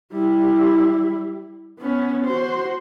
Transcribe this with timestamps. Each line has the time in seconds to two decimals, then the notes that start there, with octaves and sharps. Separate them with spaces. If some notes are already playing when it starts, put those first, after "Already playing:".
0.13 G3 E4
1.79 B3 C#4
2.26 F#4 C5